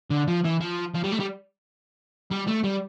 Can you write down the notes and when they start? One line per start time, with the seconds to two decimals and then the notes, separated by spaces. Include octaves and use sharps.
0.10 D3
0.28 F3
0.44 E3
0.60 F3
0.94 F3
1.04 G3
1.12 A3
1.20 G3
2.31 G3
2.47 A3
2.64 G3